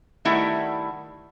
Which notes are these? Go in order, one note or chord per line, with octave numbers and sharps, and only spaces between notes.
D#3 G3 A3 E4 E5 F#5